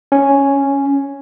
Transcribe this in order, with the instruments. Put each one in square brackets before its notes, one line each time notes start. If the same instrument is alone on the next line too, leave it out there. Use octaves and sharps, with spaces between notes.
[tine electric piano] C#4